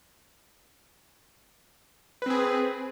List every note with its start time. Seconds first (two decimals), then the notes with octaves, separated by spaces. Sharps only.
2.22 B4
2.26 C4
2.30 G#4